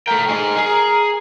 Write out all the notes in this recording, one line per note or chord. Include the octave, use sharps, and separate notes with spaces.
A3 A#4 G5
D#4 G#4
G#4